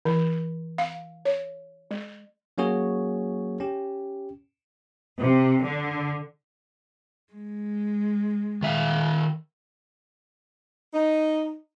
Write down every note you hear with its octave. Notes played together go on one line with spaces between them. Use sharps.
E3
F5
C#5
G#3
F#3 A#3 C#4 F#4 G#4 C#5
C#4 G4
C3
D3
G#3
D#3 E5 F5
D#4